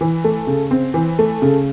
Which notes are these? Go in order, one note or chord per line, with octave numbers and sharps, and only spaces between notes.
E3
A3
C#3
C4
E3
A3
C#3